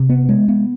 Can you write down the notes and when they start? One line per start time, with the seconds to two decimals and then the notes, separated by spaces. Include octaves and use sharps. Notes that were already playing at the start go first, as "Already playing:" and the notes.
Already playing: C3
0.09 B3
0.29 G#3
0.48 B3